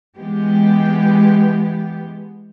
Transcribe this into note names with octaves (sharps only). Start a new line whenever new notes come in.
E3 G#3 B3 G4